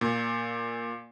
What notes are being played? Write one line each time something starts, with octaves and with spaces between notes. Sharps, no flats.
A#2